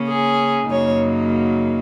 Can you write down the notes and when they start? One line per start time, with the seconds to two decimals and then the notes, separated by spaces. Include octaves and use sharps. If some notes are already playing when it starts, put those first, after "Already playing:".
Already playing: C#3 A#3 C#4
0.09 G#4
0.70 F#2 C#3 F#3 A#3 D#4 C#5